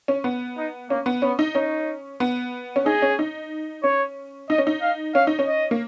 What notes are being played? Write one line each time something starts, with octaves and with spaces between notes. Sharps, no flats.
C#4
B3
D#4
A#3 C#4
B3
B3 C#4
D#4
C#4 D#4
B3
C#4
D#4 G#4
C#4
D#4
C#4 C#5
D#4 D#5
C#4
D#4
F5
C#4 F5
D#4
C#4
D#5
A#3